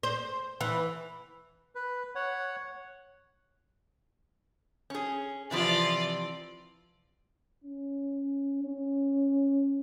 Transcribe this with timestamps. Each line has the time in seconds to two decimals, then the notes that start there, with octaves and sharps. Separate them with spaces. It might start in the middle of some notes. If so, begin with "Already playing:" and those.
0.03 C5
0.61 E3
1.75 B4
2.15 C#5 F#5
4.90 C#4 G#4
5.51 C3 E3 F3 F4 D5
7.64 C#4
8.63 C#4